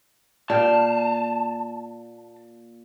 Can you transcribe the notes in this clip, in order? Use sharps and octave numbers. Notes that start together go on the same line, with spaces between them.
A#2 F5 G5 A5